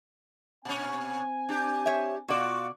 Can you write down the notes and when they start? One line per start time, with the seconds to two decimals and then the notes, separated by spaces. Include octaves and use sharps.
0.65 A#2 C4 C#4 G#5
1.49 D4 G4
1.86 C5 C#5 E5
2.28 B2 F4 F#4 D5